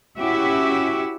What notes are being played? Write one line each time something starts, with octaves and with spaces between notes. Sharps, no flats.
C#4 E4 F#4 G4 E5